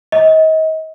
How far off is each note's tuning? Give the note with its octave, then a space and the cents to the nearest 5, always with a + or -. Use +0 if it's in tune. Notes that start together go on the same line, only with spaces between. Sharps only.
D#5 +35